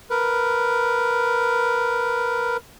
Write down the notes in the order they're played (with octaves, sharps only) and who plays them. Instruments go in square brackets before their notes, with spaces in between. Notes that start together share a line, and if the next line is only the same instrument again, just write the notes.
[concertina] A#4 B4